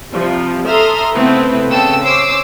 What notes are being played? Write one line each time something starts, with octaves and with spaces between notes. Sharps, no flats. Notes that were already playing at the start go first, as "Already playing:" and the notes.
C3 F3 G3
A4 E5 A#5 C6 D#6 F6
C#3 A3 B3 C4 E4 B4
C#3 B3 A4 G5 E6
C#4 C5 D6 E6 C7